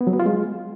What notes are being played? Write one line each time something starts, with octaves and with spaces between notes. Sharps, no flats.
B3
F#3
B3
F4
G#3